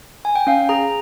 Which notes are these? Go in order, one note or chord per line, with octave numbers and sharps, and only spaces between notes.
G#5
G5
C#4 F5
G#4 A#5